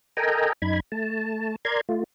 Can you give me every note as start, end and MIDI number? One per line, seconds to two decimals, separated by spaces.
0.17 0.53 69
0.17 0.53 70
0.17 0.53 75
0.17 0.53 79
0.17 0.53 80
0.17 0.53 82
0.62 0.80 42
0.62 0.80 63
0.62 0.80 83
0.62 0.80 92
0.92 1.56 57
0.92 1.56 81
1.65 1.81 70
1.65 1.81 74
1.65 1.81 82
1.65 1.81 84
1.65 1.81 92
1.89 2.04 57
1.89 2.04 65